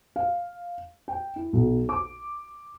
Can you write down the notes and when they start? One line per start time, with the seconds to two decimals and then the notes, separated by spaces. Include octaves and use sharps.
0.16 F5
1.08 G5
1.36 E4
1.53 B1
1.89 D6